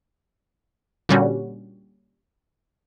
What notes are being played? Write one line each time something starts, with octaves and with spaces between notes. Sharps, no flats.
A#2 D3 G3 C#4 F#4